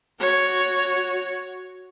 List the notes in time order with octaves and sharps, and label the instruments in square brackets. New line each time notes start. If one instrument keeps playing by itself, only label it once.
[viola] F#4 C#5